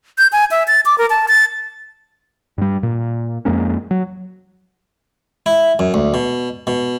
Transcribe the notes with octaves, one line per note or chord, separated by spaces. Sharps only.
G6
G#5
E5
A6
D6
A#4
A5
A6
G2 G3
A#2
F2 G#3 A#3 C#4
F#3
E4
F#2
D2
B2
B2